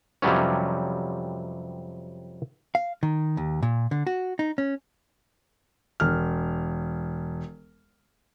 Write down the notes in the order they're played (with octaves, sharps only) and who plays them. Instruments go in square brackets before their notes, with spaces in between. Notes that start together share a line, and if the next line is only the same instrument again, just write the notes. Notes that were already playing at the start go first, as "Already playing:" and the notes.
[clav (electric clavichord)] F2 C3 F#3 G3 B3 C#4
[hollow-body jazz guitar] F5
D#3
D#2
A#2
D3
F#4
D#4
C#4
[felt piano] E1 F6